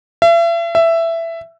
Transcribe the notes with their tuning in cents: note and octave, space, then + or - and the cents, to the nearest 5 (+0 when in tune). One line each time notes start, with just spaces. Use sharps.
E5 +40
E5 +10